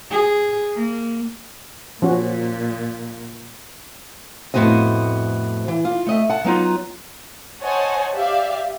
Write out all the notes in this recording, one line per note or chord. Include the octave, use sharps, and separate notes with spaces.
G#4
A#3
A#2 F3 C#4 F#4
F2 A2 B3 F#4 C5 D#5
E3
F4
A3 D#5 E5
F#5 A5
F#3 B3 D#4 F4
C5 C#5 D#5 F#5 G#5 A5
G4 D5 E5 F5